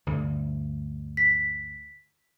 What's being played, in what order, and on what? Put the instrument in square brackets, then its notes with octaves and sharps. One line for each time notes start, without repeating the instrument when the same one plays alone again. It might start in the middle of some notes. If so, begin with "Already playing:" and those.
[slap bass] D2 G2 D3
[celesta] B6